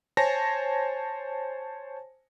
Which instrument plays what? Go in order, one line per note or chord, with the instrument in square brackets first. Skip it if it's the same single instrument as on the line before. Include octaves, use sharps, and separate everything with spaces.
[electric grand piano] C5 C#5 G#5 A5 A#6